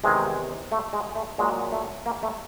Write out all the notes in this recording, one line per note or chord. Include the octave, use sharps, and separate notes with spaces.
E2 C3 D#3 G#3
A3
G#3
A3
A#2 F#3 G#3
A3
A#3
A3